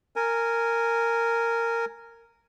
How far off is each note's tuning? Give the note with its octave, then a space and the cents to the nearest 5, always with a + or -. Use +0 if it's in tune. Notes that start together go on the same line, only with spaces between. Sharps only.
A#4 -10 G#5 +0